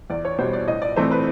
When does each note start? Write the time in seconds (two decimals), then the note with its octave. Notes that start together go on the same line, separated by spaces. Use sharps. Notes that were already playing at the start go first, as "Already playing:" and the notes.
0.10 E2 D5
0.25 C#5
0.38 B2 G3 C5
0.53 D5
0.67 A2 D#5
0.82 D5
0.96 E3 A3 C4 C5
1.11 B4